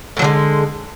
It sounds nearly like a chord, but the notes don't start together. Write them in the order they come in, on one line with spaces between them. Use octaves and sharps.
A2 F#3 D3 G#3